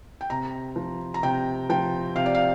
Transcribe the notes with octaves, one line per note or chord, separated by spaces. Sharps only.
G5
C3 A#5
F3
A#5
C3 G5
F3 G5
C3 F5
D5
F5